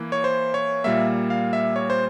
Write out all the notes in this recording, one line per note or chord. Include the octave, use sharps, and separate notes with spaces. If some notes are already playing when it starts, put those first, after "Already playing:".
Already playing: E3 A#3
C#5
C5
C#5
A#2 G3 A#3 E5
F5
E5
C#5
C5